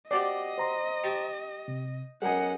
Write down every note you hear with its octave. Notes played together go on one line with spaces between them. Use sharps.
C4 F#4 G4 D5 D#5
C5 A#5 C6
G4 A5 C#6
C3
B1 F#2 G#4 A#4 D#5 F#5 G#5